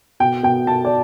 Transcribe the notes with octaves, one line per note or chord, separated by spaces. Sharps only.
B2 G5
B2 G5
B2 A5
D5